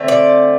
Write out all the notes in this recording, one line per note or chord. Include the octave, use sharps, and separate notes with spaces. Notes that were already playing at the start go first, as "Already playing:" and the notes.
Already playing: D3 A3 C4
D5